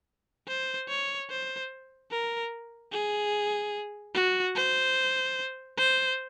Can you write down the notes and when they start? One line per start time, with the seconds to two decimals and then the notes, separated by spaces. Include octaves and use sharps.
0.48 C5
0.89 C#5
1.30 C5
2.11 A#4
2.92 G#4
4.14 F#4
4.55 C5
5.77 C5